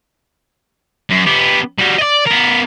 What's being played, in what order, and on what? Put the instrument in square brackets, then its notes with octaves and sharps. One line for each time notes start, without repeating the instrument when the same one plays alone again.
[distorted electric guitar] F#2
B3 G4
G3 F#4
D5 D#5
B3 A#4